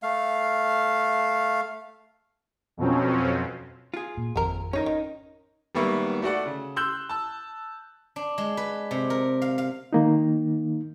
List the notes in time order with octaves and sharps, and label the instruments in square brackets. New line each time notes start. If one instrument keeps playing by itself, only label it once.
[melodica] A3 F5
[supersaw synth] F2 B2 F3 F#3 C4 C#4
[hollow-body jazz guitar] F4 G#4
[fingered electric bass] A#2
[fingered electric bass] G#1 F2 [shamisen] C4 A#4
[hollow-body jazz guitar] C#4 D#4 A#4 [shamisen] C#5
[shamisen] D#3
[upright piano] G#1 G3 A#3 B3 E5 C#6
A3 F#4 D5 F#5
C#3
C6 E6 F#6 G6
A5 E6
[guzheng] D4
G#3
B4
C3
A#4
F5
F5
[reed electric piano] D#3 A#3 D#4